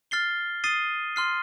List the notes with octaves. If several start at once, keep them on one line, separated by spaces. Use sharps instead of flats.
F6 A6 C7 G7
D#6 A6 C7 D#7 G7
C6 F6 C7